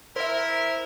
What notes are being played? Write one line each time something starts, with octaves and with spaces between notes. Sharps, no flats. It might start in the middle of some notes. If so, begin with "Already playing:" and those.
E4 A#4 C5 E5